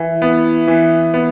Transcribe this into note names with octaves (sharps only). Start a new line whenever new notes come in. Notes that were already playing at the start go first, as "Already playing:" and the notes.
Already playing: E3 E4
B3
E3
B3